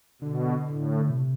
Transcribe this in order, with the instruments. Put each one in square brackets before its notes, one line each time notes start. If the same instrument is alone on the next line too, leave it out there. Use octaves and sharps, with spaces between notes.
[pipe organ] B2 [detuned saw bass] D3
[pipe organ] A2
[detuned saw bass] B2
C3